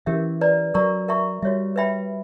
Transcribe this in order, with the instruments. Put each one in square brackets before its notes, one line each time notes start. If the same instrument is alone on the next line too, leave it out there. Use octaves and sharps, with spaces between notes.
[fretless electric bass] E3 [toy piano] C#4 G4 A#4 E5
[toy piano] B4 D5 A#5
[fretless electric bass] F#3 [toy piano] A#4 D5 A#5 C#6
[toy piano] A#4 E5 A#5 C#6
[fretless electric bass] G3 [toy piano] F#4 C#5 E5
[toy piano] B4 E5 G5 B5